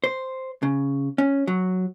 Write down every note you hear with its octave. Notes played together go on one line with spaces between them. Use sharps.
C5
C#3
C#4
F#3